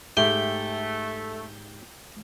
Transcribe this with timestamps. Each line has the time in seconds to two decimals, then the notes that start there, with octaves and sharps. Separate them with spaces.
0.17 G#2 A3 G4 E5 G5